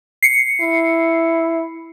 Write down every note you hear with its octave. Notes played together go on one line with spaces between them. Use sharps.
C7 C#7
E4